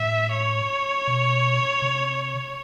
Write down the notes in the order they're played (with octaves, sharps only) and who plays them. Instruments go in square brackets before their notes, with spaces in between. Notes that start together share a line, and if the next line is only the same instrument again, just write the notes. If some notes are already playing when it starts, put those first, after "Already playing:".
Already playing: [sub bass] A2 [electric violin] E5
[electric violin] C#5
[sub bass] B2
C3